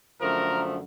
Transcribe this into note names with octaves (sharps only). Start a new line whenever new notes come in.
F#2 D3 F3 A3 A#4